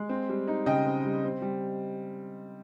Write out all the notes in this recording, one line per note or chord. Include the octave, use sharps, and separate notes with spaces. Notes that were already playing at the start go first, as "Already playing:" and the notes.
Already playing: G#3
C4
G3
D#4
C#3 D#5 G5
C4
G3
C4
G3